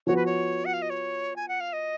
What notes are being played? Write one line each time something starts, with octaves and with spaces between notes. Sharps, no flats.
F3 B3 F#4 C#5
B4
C#5
F#5
F5
D#5
C#5
G#5
F#5
F5
D#5